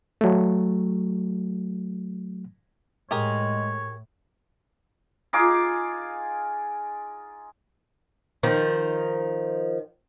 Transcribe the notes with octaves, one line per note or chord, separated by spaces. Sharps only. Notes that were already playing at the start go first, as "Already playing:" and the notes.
F#3 A3
A2 G#3 G4 G#4 A#4 C#5
D#4 F4 G#4 D6
D#3 F3